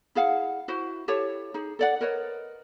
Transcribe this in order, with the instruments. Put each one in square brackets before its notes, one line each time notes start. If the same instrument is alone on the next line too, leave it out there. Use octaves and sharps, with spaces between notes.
[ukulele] E4 G#4 F5 F#5
E4 F#4 C5
E4 G4 A4 C#5
D#4 G#4
A4 D5 F#5
A#4 B4 C#5 D#5